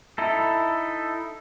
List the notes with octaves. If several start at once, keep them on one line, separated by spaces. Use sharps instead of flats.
D#4 E4 A4